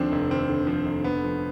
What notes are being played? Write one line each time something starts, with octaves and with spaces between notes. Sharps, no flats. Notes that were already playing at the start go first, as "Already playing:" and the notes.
Already playing: D#2 D3 F3 C4 D4
F1
D#2 C4
D3
F3
F1
D3 B3
F3